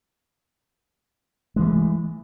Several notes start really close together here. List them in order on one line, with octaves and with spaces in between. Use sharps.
G#3 E3 A3